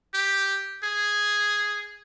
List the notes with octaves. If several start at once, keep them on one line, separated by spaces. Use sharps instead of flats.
G4
G#4